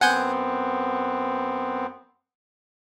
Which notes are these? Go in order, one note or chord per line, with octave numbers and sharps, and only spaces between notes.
F#2 B3 C4 F#5 G#5 G6